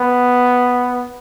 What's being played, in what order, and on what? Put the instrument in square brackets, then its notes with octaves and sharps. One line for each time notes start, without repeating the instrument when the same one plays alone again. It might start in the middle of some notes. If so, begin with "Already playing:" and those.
Already playing: [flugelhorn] B3